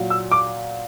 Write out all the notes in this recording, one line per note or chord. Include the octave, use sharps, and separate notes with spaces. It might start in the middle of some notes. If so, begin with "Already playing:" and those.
Already playing: A#2 F#3
E6
D6